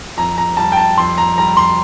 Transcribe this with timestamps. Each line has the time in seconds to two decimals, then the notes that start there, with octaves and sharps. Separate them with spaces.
0.17 F2 A#5
0.38 A#5
0.57 G3 A5
0.72 G5
0.77 A5
0.97 F2 C6
1.18 A#5
1.38 G3 A#5
1.57 C6